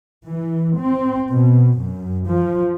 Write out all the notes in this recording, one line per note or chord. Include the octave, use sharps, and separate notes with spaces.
E3
C4
B2
F#2
F3